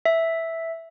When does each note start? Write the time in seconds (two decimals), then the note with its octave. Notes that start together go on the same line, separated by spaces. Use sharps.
0.06 E5